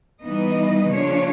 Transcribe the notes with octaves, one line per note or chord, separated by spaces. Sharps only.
E3 G3 B3 D#4 D#5
C#3 F3 A#3 D4 C#5